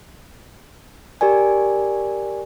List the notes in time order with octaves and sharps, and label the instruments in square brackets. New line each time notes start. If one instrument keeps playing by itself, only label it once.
[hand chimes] G4 A#4 D5 G#5